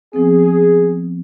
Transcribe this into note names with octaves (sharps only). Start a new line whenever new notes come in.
F3 B3 C4 G#4